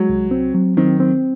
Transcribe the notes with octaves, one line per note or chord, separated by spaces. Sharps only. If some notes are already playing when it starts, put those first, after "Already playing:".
Already playing: F#3 G#3
C2
C4
F#3
D#3 C4
C4